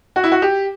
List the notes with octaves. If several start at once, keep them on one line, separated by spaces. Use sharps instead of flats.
F#4
E4
F#4
G4